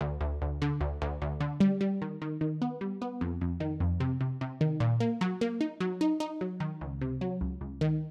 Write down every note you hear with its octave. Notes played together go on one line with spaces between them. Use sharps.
D2
D2
D2
D3
D2
D2
D2
D3
G3
G3
D#3
D#3
D#3
B3
G3
B3
F2
F2
D#3
F2
C3
C3
C3
D#3
A#2
A#3
F#3
A#3
D#4
F#3
D#4
D#4
F#3
D#3
C#2
C3
F#3
C#2
C#2
D#3